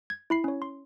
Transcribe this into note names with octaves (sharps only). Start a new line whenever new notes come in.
G#6
E4 B5 C7
C#4 C#5
C6